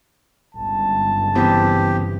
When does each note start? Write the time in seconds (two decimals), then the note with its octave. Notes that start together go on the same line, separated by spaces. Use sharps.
0.54 G1 C#2 A5
1.35 E3 B3 C4 G4